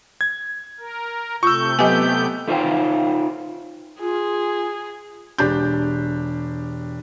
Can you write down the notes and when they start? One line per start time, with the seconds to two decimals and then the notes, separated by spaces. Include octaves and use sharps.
0.21 G#6
0.79 A#4
1.43 C3 A3 F4 C#6 E6 G6
1.79 F#3 B3 G4 D#5 G#5
2.48 A3 D#4 F4 C5 F5 G5
4.00 F4 G#4
5.38 E1 D4 G4 G6